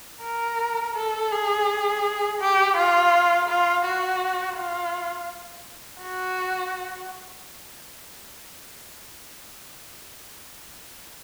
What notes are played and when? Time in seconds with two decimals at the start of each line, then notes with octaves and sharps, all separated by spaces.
0.23 A#4
0.95 A4
1.31 G#4
2.40 G4
2.77 F4
3.49 F4
3.85 F#4
4.57 F4
6.01 F#4